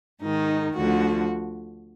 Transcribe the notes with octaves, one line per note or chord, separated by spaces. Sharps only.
G#2 D#3 D#4
D2 D3 F3 F#4